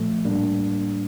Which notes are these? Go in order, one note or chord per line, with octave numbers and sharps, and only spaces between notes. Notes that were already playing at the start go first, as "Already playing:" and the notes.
Already playing: A#2 F3 A3
A2 G3 A#3 D4